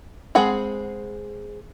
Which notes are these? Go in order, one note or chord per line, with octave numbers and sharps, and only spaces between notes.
G#3 C4 G#4 F#5 B5